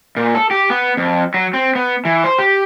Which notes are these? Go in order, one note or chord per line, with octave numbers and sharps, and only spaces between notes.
A#2
A4
G4
B3
F2
F#3
C4
B3
E3
C5
G4